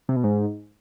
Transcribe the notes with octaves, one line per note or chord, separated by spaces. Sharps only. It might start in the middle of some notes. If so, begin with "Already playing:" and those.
C3
B2
G#2